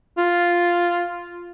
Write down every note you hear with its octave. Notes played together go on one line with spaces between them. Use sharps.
F4